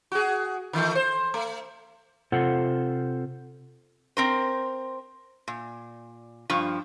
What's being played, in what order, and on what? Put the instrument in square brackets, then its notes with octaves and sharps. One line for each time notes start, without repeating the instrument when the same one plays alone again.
[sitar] F#4 G#4
D#3 E3 A3
C5
A3
[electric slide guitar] C3 F4 A4 C5 F#5
[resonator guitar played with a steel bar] C4 A#4 C5
A#2
G2 F3